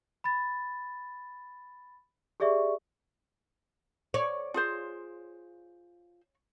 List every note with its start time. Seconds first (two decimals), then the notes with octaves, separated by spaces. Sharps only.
0.24 B5 A6
2.40 G4 G#4 D5 E5 C#6
4.14 C#5 D5
4.54 F4 G#4 C5